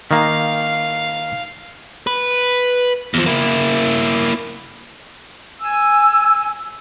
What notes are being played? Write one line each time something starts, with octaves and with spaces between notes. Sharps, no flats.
D#3 A#3 F5
B4
E2 F3
A#3 E4
G#5 E6